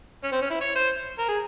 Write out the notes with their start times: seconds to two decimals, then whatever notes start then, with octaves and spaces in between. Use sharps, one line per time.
0.24 C#4
0.32 C4
0.42 C#4
0.50 E4
0.61 C#5
0.75 C5
1.19 A#4
1.28 G#4